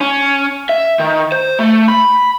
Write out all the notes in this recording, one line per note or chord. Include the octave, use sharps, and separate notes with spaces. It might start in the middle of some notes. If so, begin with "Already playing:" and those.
C#4
E5
D#3
C5
A3
B5